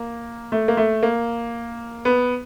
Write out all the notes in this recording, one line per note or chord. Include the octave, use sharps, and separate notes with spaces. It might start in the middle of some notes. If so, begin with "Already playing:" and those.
Already playing: A#3
A3
A#3
A3
A#3
B3